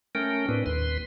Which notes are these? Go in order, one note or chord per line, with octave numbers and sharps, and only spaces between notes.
A3 C#4 A#4 G5
A2 C4 D4 B4
D#2 B4 C6